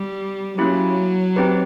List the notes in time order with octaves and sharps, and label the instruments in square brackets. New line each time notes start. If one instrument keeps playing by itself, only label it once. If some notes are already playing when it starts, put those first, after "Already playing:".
Already playing: [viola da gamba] G3
[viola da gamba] F#3 [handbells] A#3 C#4 E4 G4
[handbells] C4 D#4 G4 B4